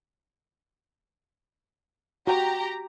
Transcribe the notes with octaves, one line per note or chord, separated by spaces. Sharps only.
F#4 G4 G5 A#5